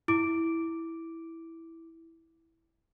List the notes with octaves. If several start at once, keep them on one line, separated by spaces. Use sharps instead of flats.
E4 D6 D7